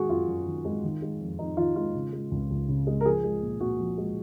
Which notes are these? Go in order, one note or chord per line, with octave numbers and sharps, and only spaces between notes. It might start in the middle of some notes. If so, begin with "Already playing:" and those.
Already playing: D#3 G#3 F#4 G#4
F#2 F4
F#2
D#3
G#3
D#3
G#3
F2
F2 D#4
D#3 F4
G#3 F4
C#3
G#3
C#2
C#2
C#3
G#3
A#4
F3 G#4
G#3
A#2
A#2 F#4
F3
G#3